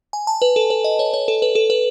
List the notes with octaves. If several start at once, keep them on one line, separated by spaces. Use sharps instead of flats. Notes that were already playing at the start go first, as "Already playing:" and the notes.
G#5
A5
B4
A4
B4
D#5
C#5
C#5
A4
B4
A4
B4